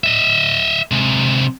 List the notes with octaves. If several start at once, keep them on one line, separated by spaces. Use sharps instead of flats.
D#5 E5
C3 G#3